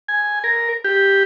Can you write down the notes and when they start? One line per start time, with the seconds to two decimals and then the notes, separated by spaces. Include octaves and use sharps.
0.08 G#5
0.44 A#4
0.84 G4